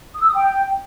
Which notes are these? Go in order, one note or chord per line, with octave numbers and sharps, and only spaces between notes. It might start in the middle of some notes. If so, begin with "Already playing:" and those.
D#6
E6
D#6
G5